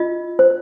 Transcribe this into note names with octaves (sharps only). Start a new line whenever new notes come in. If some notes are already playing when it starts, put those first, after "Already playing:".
Already playing: F4 D#5
C5